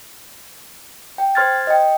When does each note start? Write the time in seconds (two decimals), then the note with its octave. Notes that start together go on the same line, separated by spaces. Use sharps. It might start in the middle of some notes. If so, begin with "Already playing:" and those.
1.18 G5
1.35 C5 C6 F6 G#6 A6
1.67 D#5 G5